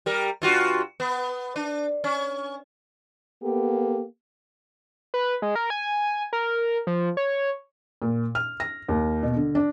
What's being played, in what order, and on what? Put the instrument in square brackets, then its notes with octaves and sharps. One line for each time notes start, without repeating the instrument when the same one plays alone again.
[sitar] G3 A#4
G2 F4 F#4
B3
D4
C#4
[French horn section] A#3 B3 G4 A4
[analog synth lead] B4
G#3
A#4
G#5
A#4
F3
C#5
[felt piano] A#2
F6
A#6
D#2
B2
D3
D4